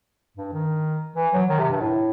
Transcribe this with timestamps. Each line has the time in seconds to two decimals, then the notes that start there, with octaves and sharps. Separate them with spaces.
0.37 G2
0.53 D#3
1.16 E3
1.33 F#3
1.49 D#3
1.59 C3
1.70 G2
1.81 A2